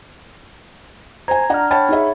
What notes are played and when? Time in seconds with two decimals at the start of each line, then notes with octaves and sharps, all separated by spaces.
1.28 C5 G#5 A#5 G#6
1.50 D4 D5 F#5 A#5 F6
1.71 C#5 F#5 G5 A5 B5 A6
1.89 D#4 G#4 E5